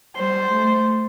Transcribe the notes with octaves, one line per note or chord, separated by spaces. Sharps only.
G3 C5
A3